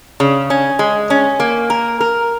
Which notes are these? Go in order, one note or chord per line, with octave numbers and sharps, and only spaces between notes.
C#3
C#4
G#3
C#4
A#3
A#4
A#4